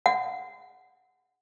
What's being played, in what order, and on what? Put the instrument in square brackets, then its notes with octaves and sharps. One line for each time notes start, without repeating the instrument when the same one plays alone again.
[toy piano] F#5